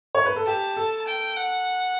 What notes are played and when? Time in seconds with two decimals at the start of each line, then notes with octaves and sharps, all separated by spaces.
0.15 C#5
0.25 B4
0.36 A4
0.46 G4 A5
0.77 A4
1.08 G5
1.37 F#5